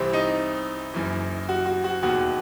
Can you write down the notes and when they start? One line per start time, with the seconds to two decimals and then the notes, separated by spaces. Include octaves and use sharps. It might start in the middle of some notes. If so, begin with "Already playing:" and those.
Already playing: C2 C3 E3 C4
0.13 D#4
0.94 F#1 F#2 E3
1.49 F#4
1.66 F#4
1.84 F#4
2.02 E1 D#2 D#3 F#4